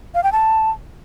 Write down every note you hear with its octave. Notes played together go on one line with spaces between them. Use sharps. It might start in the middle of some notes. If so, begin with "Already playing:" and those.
F5
G5
A5